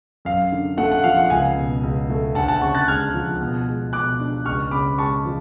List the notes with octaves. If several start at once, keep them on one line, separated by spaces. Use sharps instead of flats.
F#2 F5
D3
A3 F#5
F#5
F3 F5
F#5
C#2 F5 G#5
B2
C#2
A3
D2 F#5 A5
F#5 A5
C#3 A5 C#6
F#6 A6
G#3 F6 G#6
F3
B2
G#3
B2 D6 F#6
D4
C#2 C#6 F6
C#3 B5 D6
G#3 A5 C#6
F3